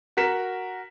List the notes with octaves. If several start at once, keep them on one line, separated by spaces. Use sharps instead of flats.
F#4 A#4 B6 E7